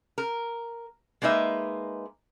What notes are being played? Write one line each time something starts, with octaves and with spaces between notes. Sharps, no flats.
A#4
G#3 A#3 D#4 B4 E5